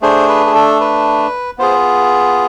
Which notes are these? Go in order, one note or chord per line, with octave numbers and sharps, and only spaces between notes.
A3 D4 G#4 C5
B4
G#4
A4
B4
B3 F4 G#4 C5